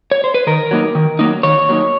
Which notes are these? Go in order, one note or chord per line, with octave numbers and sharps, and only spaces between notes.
C#5
C5
B4
D#3 A#4
F#3 A#3 D#4
D#3
F#3 A#3 D#4
D#3 C#5
F#3 A#3 D#4